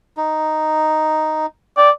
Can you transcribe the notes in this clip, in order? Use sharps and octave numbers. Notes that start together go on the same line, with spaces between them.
D#4
D5 G5